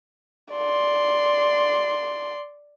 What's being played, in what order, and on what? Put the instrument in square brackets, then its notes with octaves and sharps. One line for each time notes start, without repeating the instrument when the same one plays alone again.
[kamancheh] D5 C6